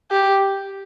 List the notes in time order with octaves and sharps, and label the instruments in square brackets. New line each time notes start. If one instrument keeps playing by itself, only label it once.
[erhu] G4